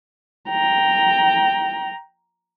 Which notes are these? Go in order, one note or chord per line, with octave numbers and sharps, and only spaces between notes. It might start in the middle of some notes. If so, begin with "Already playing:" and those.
G5 A#5